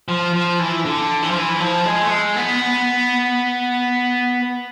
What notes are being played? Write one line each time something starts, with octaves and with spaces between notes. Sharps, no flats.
F3
F3
E3
D3
E3
F3
E3
F3
G#3
A3
G#3
B3